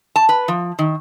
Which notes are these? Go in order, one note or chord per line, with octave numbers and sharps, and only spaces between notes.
A5
B4
F3
D#3